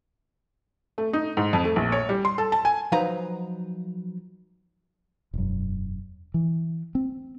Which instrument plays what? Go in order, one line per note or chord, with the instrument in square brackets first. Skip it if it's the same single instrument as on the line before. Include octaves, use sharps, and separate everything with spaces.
[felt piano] A3
D#4
G#2
F2
A3
A#1
C#5
G3
C6
A4
A5
G#5
[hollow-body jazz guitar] F3 F#3 D#4 B4 C5 A#5
[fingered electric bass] E1 F#2
E3
C4